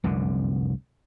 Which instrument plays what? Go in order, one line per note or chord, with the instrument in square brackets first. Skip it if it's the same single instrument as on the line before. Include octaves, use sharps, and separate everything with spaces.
[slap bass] F1 C2 F#2 D3